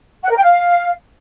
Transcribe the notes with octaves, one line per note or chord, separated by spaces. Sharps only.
F#5
A#4
G5
F5